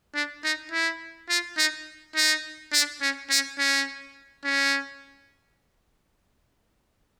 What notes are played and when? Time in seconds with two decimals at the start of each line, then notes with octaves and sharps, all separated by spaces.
0.14 D4
0.43 D#4
0.71 E4
1.29 F4
1.57 D#4
2.16 D#4
2.73 D4
3.01 C#4
3.30 C#4
3.58 C#4
4.45 C#4